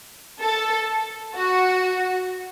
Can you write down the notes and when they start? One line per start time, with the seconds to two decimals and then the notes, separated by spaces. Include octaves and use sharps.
0.42 A4
1.36 F#4